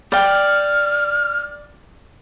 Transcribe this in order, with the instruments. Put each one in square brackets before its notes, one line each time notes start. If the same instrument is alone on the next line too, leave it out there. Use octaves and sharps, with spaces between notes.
[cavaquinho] D5 G5 [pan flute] F6